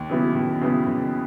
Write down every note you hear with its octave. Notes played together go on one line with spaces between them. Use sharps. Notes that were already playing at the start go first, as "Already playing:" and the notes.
Already playing: D#2
C#3 F#3 B3 E4
D#2
C#3 F#3 B3 E4
D#2